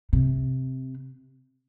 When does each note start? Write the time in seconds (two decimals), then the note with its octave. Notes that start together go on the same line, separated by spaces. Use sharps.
0.13 C3